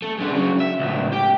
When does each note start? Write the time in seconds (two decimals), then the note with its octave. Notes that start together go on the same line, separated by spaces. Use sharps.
0.02 A3
0.18 G#3 D4
0.31 C#3 F#3
0.60 E5
0.79 C#2 A2
1.12 G4 G5